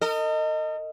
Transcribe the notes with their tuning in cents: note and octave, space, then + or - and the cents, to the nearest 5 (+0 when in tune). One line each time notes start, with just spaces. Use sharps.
A#4 -45 D#5 +0